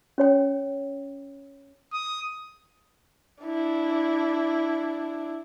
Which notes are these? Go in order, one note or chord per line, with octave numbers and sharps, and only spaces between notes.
C#4 C#5 G5
D#6
D4 E4